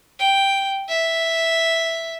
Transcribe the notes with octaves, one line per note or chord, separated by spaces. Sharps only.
G5
E5